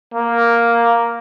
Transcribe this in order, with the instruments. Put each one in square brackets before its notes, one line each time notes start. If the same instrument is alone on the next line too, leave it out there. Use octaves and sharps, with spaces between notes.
[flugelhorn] A#3